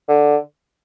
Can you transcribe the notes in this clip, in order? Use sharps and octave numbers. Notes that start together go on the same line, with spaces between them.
D3